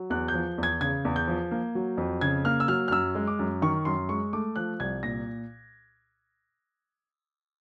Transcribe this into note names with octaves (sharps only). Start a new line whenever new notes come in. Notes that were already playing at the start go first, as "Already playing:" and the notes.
Already playing: F#3
E2 F#6
G6
F3
E2
G#6
C#3 G#6
E2
G6
F3
A#3
F#3
F2
C#3 G#6
A#3 F6
E6
F#3 F6
F6
F#2 E6
G#3
D6
F#2
D#3 C#6
F#2 C6
G#3 C#6
A3 D6
F3 F#6
C2 G#6
A#2 A#6